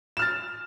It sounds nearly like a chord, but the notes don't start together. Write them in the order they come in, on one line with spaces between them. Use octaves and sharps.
E7 F6 A6